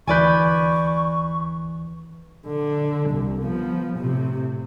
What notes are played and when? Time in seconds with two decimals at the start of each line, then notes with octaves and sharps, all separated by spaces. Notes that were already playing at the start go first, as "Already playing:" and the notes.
0.07 D2 E3 B4 D5 G#5 C#6 G6
2.47 D3
3.10 C2
3.41 F3 B3
3.98 A2 C3